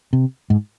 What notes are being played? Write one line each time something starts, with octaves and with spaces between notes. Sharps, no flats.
C3
G#2